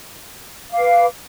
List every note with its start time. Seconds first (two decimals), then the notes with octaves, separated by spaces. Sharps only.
0.70 F5
0.74 D6
0.78 B4